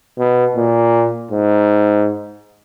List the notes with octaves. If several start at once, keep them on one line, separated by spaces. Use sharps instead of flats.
B2
A#2
G#2